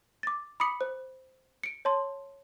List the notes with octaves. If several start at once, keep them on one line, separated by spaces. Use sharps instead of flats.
D6 A6
B5 D6 D#6 B6 C#7 F#7
C5
C#7 D7
C#5 A5 C6